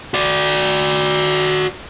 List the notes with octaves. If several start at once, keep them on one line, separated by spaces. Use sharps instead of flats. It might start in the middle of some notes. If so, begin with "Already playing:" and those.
F#4 D5